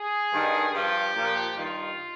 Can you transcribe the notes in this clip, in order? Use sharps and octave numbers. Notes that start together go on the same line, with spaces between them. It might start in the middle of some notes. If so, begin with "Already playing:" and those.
Already playing: G#4
G2 D#3
G2 F3 G4
A#2 F3
G2 D#3 F4